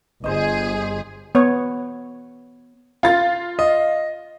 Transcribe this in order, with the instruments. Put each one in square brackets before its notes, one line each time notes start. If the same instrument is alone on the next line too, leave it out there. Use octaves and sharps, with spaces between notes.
[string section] G1 G#4 [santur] C5 D#5
[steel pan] B3 C#5
[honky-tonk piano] F4 A6
[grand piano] D#5